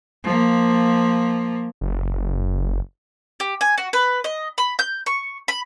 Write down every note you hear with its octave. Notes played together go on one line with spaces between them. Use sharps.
F3 A#3
F#1
G4
G#5
F#4
B4
D#5
B5
G6
C#6
B5